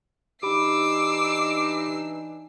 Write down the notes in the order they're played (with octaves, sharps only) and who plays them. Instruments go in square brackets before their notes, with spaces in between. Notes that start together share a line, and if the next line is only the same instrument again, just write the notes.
[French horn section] E3 D4 D#4 [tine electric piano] G4 B5 [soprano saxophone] D6 [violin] E6 C7